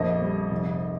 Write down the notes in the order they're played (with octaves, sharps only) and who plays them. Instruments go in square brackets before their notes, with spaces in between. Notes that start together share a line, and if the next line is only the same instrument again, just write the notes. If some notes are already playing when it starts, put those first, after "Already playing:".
Already playing: [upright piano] A#1 F2 D#5
G3
F1